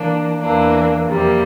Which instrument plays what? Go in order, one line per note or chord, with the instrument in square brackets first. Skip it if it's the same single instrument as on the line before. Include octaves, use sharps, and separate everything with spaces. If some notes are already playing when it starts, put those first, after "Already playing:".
Already playing: [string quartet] E3 A#3 D4
E2 E3 A#3 D4
F2 C3 G3 A#3